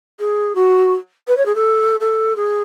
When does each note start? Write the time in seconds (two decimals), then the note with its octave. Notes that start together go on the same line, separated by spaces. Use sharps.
0.19 G#4
0.55 F#4
1.28 B4
1.37 C#5
1.46 G#4
1.55 A4
2.00 A4
2.36 G#4